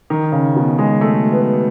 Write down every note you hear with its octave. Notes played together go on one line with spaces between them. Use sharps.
D#3
C#3
B2
G#3
A3
B3